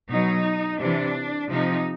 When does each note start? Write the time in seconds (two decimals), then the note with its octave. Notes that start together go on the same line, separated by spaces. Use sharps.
0.08 B2 F#3 D#4
0.78 C3 E3 D4
1.49 C3 F3 D#4